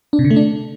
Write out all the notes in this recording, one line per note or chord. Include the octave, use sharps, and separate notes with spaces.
D4
C3
D3
A3
D4